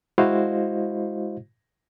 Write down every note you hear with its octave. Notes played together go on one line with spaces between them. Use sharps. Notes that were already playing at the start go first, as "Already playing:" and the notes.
G#3 E4 F#4 C5 D#5 F5